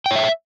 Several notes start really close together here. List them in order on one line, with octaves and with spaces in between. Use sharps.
G5 C#5 E5